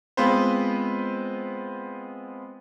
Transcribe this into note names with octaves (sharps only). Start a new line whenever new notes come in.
G#3 B3 C4 F4 B4 C5